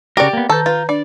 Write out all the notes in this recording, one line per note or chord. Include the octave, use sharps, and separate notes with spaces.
C#3 F#4 G4 A#4 D5
A#3 B3
D#3 A4 B4 A#5 G6
F4 B4
D4 D5